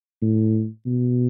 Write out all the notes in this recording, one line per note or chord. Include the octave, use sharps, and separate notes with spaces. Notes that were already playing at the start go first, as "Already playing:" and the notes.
A2
B2